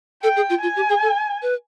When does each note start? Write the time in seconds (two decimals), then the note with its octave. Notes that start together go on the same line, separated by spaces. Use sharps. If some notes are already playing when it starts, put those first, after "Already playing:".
0.23 A4 G5
0.36 G#4
0.50 F4
0.62 F4 G#5
0.76 G4
0.89 G#4
1.02 A4
1.42 B4